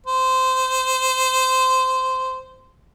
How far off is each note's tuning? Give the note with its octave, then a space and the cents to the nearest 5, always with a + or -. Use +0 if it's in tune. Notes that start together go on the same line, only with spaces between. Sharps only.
C5 -15